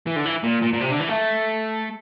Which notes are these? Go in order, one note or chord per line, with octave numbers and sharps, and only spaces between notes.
E3
D3
E3
A#2
A#2
A#2
C3
D3
E3
A3